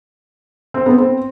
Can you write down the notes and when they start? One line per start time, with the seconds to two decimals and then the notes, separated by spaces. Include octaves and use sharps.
0.74 C4
0.86 B3
0.98 C4